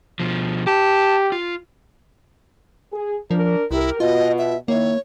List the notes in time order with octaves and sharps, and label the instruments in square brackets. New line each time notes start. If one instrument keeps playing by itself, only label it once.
[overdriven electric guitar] B2 F3
[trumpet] G4 [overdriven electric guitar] A5
[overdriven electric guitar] F4
[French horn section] G#4
[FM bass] F3 [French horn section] D4 A#4
[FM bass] C2 [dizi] E4 [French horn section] G4 A#4
[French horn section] B2 [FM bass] F4 [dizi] D#5
[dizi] E5
[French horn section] D#3 E4 [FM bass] A#3 [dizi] C#5